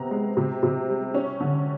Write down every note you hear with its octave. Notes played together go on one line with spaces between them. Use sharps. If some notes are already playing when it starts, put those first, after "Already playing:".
Already playing: C3 B3 A#5
G#3
C3
C3
G3
C#4
D3